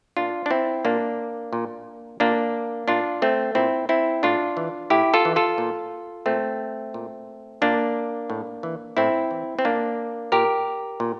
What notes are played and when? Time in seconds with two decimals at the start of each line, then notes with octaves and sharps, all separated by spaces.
0.17 A#2 D4 F4
0.46 D4
0.51 C4 E4
0.85 A#2 A#3 D4
1.53 A#2
2.20 A#2 A#3 D4
2.88 A#2 D4 F4
3.22 A3 C4
3.55 A#2 C4 E4
3.89 C4 E4
4.23 A2 D4 F4
4.57 E3
4.90 A2 E4 G4
5.14 F4 A4
5.25 E3
5.36 F4 A4
5.58 A#2
6.26 A#2 A3 C4
6.94 A#2
7.61 A#2 A#3 D4
8.30 A2
8.63 E3
8.97 A2 C4 E4
9.31 E3
9.59 C4
9.65 A#2 A#3 D4
10.32 A#2 G4 A#4
11.00 A#2